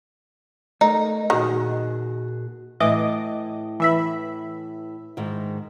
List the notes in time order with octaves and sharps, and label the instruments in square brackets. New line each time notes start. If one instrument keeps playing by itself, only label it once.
[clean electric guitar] A3 A#4 [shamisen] D#4
[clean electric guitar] A#2 F#4 G#4 [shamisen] D#3
[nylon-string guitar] A2 [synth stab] E3 D#5 D6
[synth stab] E3 E5 B5
[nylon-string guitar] G#2 D#3